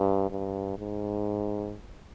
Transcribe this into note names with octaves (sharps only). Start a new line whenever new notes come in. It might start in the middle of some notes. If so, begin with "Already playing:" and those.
Already playing: G2
G2
G#2